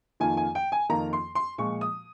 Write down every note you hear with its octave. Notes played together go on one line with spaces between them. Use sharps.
F2 D#3 A#3 F4 G#5
G#5
G5
G#5
F2 D#3 A#3 F4 A#5
C6
C6
A#2 F3 G#3 C#6
D#6